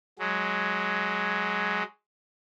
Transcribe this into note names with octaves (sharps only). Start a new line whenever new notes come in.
F#3 G#3